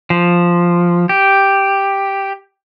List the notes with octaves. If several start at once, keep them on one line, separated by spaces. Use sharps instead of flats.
F3
G4